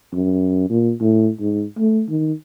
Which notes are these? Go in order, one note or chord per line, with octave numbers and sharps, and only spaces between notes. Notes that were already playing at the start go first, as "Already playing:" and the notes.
F#2
A#2
A2
G#2
A3
D#3